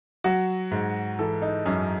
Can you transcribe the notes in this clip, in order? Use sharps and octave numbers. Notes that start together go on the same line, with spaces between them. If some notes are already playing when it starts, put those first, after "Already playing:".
F#3 F#4
G#2
E3 A4
D#4
F#2 C#4